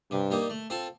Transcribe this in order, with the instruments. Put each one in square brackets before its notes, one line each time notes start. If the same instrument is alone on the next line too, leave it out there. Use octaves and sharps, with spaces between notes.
[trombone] G2 [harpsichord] C3
[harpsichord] G3 A#3 D#4
A3
C4 F4 A4